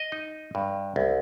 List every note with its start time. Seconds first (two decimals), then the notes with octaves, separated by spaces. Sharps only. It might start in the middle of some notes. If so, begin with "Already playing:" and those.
Already playing: D#5
0.12 D#4
0.55 G2
0.96 C2